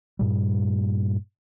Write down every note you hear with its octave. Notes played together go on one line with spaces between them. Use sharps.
G2 A#2 G3